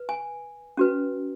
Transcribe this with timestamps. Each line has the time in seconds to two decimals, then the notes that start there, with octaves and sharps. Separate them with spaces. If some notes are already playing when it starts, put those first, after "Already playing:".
Already playing: B4
0.09 G#5
0.77 C#4 F#4 B4